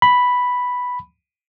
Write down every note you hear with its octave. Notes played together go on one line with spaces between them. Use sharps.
B5